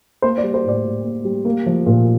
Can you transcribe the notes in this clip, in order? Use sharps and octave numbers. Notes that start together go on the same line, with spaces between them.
A#3 C5
D5
G3
C5
A2 D5
A2
A#3
G3
A#3
F3
A#2